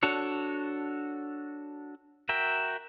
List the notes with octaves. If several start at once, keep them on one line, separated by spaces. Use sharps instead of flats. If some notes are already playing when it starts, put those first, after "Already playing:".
D4 F#4 A4 C#5
F#4 A#4 E5 G5